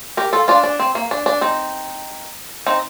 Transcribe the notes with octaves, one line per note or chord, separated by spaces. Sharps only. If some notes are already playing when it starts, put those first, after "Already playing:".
G4 A#4
F4 A4
D4 F4
D4
C4
A#3
D4
D4
C4 D#4
C4 D#4